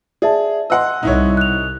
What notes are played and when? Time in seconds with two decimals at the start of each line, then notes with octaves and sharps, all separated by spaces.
0.22 G#4 D5 E5 A5
0.70 D#5 F#5 C6 E6 F#6
1.03 C2 D#4 E4 C#5
1.37 F#6 F7